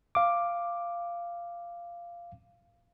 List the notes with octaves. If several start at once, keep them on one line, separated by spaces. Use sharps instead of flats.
F5 D6